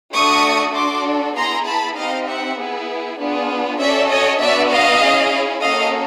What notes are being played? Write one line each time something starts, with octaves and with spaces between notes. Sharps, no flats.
A3 D4 F#4 A4 C#6 D#6
D4 F#4 A4 C6 D6
B3 E4 G#4 A#5 C6
A5 B5
C4 D#4 G4 D#5 F5
E5 F#5
B3 E4 G#4
B3 D4 F4 G#4
C#4 F#4 A4 D5 E5
C#5 D#5
B3 D4 F#4 D5 E5
D#5 F5
C#4 E4 G#4
A#3 C#4 F#4 A4 D#5 F5